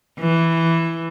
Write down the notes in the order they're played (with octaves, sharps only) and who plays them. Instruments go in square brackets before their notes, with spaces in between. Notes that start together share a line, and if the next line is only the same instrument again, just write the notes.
[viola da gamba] E3